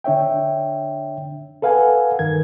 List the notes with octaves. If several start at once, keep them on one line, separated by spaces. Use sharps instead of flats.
D3 D4 C#5 E5 G5
A4 B4 F5 F#5 G#5
G2 D#3 A#4 G#6